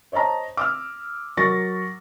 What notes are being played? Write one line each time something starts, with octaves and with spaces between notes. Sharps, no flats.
C5 C#5 D#5 A5 A#5
D6 E6 F6
F#3 A#4 C#6 A6 A#6